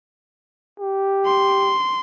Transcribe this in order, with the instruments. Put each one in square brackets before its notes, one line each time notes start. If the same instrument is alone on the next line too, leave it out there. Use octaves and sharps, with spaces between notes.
[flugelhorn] G4
[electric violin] C6